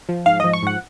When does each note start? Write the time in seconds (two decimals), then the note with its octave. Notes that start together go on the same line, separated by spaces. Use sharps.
0.09 F3
0.26 G#2 F5
0.40 F3 D#5
0.53 C#6
0.63 G#2 F#5